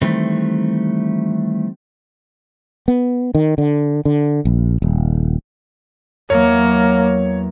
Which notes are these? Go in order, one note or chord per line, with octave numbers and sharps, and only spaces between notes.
D#3 E3 G3 A3 C4
B3
D#3
D3
D3
A#1
D#1
E2 F#3 A#3 C#5